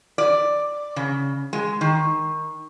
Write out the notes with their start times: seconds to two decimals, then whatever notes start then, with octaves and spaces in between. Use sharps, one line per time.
0.18 D5
0.96 C#3
1.53 G#3
1.81 D#3